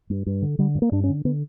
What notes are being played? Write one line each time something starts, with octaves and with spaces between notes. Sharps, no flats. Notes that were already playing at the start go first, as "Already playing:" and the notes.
G2
G2
D3
D3 G3
G2
A#3
G2 D4
C#4
D3
D3 B3